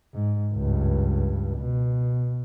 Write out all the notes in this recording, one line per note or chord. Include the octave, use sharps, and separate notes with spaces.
G#2
C#2 G2
B2